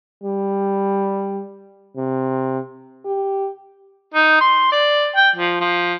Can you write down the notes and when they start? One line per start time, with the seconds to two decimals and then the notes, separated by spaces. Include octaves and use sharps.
0.24 G3
1.96 C3
3.05 G4
4.14 D#4
4.41 C6
4.72 D5
5.16 G5
5.36 F3
5.60 F3